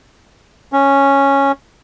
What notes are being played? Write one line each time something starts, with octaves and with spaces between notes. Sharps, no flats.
C#4